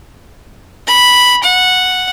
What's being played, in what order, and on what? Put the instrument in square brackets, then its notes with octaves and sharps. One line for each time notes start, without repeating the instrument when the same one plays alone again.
[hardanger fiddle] B5
F#5